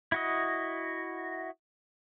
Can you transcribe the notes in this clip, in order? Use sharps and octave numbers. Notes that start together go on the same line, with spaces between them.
E4 F#4 D#5